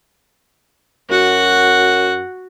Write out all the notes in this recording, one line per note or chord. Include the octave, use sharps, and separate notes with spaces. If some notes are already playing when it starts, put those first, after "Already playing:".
F#2 F#4 F#5